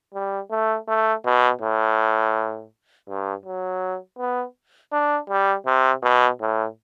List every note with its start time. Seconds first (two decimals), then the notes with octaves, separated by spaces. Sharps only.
0.14 G3
0.51 A3
0.88 A3
1.25 B2
1.62 A2
3.08 G2
3.46 F#3
4.19 B3
4.93 D4
5.30 G3
5.66 C3
6.03 B2
6.41 A2